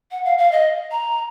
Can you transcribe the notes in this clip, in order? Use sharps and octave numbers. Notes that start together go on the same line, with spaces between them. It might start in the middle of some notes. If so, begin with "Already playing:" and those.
F#5
F5
F5
D#5
A#5